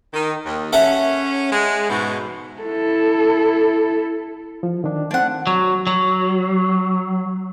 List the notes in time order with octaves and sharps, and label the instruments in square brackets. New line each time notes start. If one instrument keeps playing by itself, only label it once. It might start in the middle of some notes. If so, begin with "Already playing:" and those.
[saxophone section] D#3
D#2
[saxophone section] C#4 [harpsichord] A4 E5 F#5
[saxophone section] G#3
G#2 B2 F#4
[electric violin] E4 A4
[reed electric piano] F3
D#3 D4
[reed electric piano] A3 C4 [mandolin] D4 F#5
[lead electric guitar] F#3
F#3